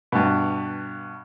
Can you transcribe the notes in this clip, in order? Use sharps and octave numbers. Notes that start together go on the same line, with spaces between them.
G2 B2